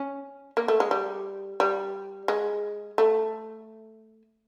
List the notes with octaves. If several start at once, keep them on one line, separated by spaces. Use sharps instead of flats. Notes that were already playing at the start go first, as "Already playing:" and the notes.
Already playing: C#4
A#3
A3
G#3
G3
G3
G#3
A3